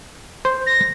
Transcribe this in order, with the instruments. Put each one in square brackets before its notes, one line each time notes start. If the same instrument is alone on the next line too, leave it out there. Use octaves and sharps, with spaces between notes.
[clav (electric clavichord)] C5
[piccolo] A#6